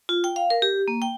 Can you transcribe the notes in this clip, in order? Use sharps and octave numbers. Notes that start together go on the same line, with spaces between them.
F4
G5
F5
A#4
G4
A#3
G5